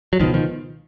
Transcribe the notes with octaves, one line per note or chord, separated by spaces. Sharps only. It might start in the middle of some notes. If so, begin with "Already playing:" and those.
F#3
C#2 B2 D#3 F3
D#3 F3